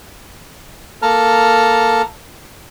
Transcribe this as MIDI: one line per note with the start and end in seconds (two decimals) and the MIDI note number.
1.02 2.02 58
1.02 2.02 69
1.02 2.02 81
1.02 2.02 82
1.02 2.02 89